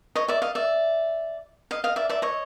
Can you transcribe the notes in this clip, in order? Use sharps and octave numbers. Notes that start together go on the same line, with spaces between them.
C#5 D#5
D5 E5
D#5 F5
D5 E5
D#5 F5
D#5 F5
D5 E5
D5 E5
C#5 D#5